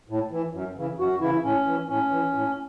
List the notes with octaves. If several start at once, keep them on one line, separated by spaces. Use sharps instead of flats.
A2
E3
F#2
C#3 E3
F#2 F#4
C#3 E3 E4
A2 C#4
E3
A2 C#4
E3
A2